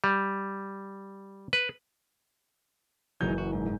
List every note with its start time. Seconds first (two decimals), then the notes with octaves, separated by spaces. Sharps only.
0.04 G3
1.53 B4
3.21 F#1 E3 F#3 G#3 D#4 G6
3.38 F#4
3.52 G#2
3.66 G#2